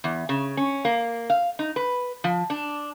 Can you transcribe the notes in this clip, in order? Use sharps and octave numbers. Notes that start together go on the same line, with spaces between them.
E2
C#3
C#4
A#3
F5
D#4
B4
F3
D4